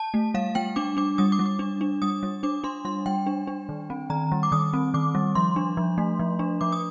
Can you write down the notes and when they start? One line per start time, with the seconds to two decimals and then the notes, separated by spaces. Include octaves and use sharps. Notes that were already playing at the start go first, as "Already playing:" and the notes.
Already playing: A5
0.14 A3
0.34 G3 F5
0.55 G3 G5
0.76 D4 D6
0.97 D4 D6
1.18 G3 D#6
1.32 D6
1.39 G3
1.46 D6
1.59 D4
1.81 D4
2.02 G3 D#6
2.23 G3
2.43 D4 D6
2.64 D4 C6
2.85 G3 C6
3.06 G3 G5
3.27 D4
3.47 D4
3.69 D#3
3.90 C4
4.10 D#3 A#5
4.32 G3
4.43 D6
4.52 D#3 D#6
4.73 C4
4.94 D#3 D6
5.15 G3
5.35 F3 C6
5.56 D4
5.77 F3
5.98 A3
6.19 F3
6.39 D4
6.61 F3 D6
6.72 D#6